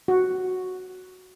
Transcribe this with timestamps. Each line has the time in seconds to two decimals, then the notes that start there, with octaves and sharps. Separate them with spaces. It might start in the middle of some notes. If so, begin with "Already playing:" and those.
0.08 F#4